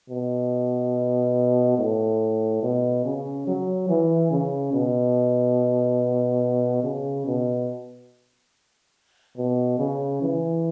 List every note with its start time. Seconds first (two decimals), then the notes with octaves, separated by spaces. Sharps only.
0.10 B2
1.78 A2
2.63 B2
3.05 C#3
3.47 F#3
3.89 E3
4.31 C#3
4.73 B2
6.84 C#3
7.26 B2
9.37 B2
9.79 C#3
10.22 E3